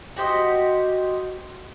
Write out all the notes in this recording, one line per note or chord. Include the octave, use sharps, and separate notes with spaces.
F#4 G4 C5 D#5